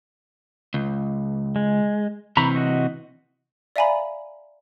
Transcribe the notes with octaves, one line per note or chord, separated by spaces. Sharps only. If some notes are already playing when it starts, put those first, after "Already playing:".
C#2
G#3
C3 E3 A#5 B5 C#6
F#4 D#5 C#6
D5 E5 F5 G#5 A#5 B5